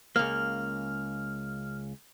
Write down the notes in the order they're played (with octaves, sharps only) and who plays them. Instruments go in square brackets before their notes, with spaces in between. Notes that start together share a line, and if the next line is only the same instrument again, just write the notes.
[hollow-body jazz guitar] C#2 A#3 [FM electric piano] F6